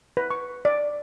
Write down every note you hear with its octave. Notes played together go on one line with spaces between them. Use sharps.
B4
C#6
D5